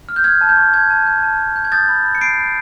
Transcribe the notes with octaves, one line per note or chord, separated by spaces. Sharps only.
F6
G6
F6 G#6
A5
G6
C#6
A5 G#6
A5
G6
A5
A5
G6
G#6
D#6 G6 A6
B5
B5
C#7
B5 C7 D7
B5